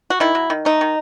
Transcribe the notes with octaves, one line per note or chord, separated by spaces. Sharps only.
F#4
D#3 E4
F#3
D#3
A3 D#4
D#3